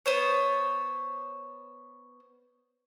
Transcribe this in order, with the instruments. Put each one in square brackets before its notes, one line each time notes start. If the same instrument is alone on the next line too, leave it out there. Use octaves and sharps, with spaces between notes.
[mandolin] B3 C5 C#5